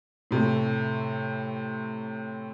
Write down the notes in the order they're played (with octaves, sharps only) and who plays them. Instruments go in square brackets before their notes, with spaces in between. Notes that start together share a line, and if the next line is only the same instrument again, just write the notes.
[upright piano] A2 C3 A3